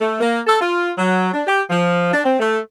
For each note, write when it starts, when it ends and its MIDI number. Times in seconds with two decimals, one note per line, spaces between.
0.01 0.18 57
0.21 0.40 58
0.47 0.60 69
0.61 0.90 65
0.98 1.30 54
1.33 1.42 62
1.47 1.61 67
1.70 2.09 53
2.13 2.21 62
2.25 2.37 60
2.40 2.58 57